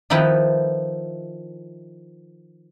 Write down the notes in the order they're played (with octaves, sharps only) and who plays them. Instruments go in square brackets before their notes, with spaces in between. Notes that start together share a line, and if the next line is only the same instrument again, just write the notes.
[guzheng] D#3 F3 D#4 E4 B4